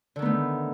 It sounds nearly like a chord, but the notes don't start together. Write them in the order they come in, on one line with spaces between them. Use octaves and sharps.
D3 D#3 B3 A3